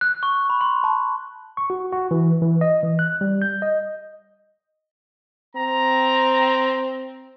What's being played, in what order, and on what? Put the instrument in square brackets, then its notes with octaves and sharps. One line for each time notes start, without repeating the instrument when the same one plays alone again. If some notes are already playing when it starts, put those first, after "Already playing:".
[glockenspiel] F#6
C#6
B5
C6
A5
[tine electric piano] C#6
F#4
F#4
E3
E3
D#5
E3
F#6
G3
G6
D#5
[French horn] C4 [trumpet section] A#5